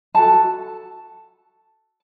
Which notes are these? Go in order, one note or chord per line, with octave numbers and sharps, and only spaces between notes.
F#4 A4 A5